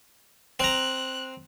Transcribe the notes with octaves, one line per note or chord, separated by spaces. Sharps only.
C4 A#5 F#6